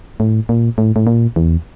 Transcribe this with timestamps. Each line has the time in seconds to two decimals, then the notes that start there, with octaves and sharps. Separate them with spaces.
0.20 A2
0.49 A#2
0.78 A2
0.96 A2
1.07 A#2
1.36 E2